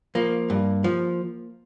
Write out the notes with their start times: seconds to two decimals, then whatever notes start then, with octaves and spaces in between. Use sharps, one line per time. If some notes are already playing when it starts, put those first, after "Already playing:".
0.15 F3 A#3
0.50 G2
0.84 F3